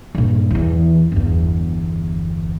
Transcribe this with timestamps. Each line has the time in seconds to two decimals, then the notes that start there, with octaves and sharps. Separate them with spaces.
0.15 G2 A#2
0.51 E2 E3
1.12 G1 E2